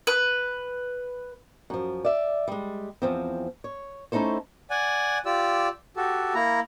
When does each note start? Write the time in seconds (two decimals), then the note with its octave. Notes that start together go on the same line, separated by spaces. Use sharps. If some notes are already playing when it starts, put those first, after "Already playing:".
0.07 B4
1.70 F#2 F3
2.05 D5 E5
2.48 G3 G#3
3.02 E2 F3 C4
3.64 C#5
4.12 A3 C#4 D#4 E4 A4 C5
4.71 D5 F#5 G#5
5.26 F4 G4 D5 E6
5.97 F#4 G4 A4
6.35 A#3 E4 A#5